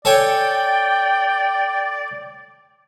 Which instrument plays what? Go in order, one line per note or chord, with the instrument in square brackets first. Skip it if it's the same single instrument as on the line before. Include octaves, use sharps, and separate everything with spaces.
[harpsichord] A4 C#5 G#5 [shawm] D5 [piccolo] G5